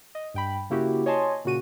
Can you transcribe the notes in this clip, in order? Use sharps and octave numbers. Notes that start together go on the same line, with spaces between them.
D#5
G2 G5 B5
C#3 A#3 E4 F#4 G4
C#5 D#5 G#5 A5 C6
A#2 C#3 F#4 D#7